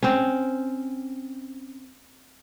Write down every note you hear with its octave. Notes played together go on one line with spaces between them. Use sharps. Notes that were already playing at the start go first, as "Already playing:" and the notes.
C4 C#4